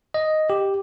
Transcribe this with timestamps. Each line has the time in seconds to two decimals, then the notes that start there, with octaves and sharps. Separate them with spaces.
0.14 D#5
0.50 G4